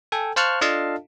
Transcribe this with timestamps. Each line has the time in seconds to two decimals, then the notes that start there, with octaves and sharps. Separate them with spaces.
0.12 A4 G5 G#5
0.36 C5 F5 A5 C#6 F6 F#6
0.61 D4 F4 A4 D#5 F5 A5